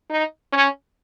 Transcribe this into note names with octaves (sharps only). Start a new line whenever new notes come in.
D#4
C#4